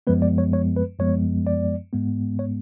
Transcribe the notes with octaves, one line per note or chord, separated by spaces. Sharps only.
F#2 F3 G#3 B3 B4
D5
C#5
C#5
B4
F#2 F3 G#3 B3 C#5
D5
G#2 G#3 B3
C#5